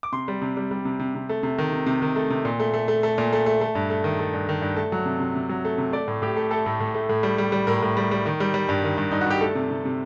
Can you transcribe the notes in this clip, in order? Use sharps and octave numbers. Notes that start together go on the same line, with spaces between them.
D6
C3 C6
G3
C3
G3
G3
C3
C3
C3
A3
C3
D#3
C3
C3
D#3
A3
C3
A#2
A3
A3
A3
A3
A#2
A3
A3
A3
G2
A3
D#3
A3
G2
D#3
G2
A3 A5
F#3
C3
C3
C3
F#3
A3
C3
A3 D5
A2
A2 G4
A3
A3 A4
A2
A2
A3
A2
G3
G3
G3
A2 A#4
A2
G3
G3
D#3
G3
G3
G2
D#3
G2
G2 D#4
F#4
G2 G4
A3 A4
C3
C3
C3